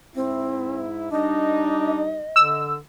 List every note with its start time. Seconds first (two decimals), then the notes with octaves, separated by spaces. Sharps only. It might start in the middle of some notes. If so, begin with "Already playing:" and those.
0.15 G#2 C4 E4
1.11 G3 D4 D#4 D#5
2.36 D3 E6